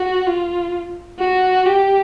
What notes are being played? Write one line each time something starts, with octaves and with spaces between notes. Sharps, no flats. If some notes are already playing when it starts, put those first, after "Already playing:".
Already playing: F#4
F4
F#4
G4